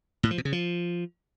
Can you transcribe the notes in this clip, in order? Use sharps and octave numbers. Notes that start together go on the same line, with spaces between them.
A2
F3
B2
C#3
F3